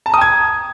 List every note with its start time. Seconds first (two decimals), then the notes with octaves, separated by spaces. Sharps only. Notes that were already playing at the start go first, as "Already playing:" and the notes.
0.06 A5
0.10 A#5
0.14 D#6
0.18 G5
0.21 G#6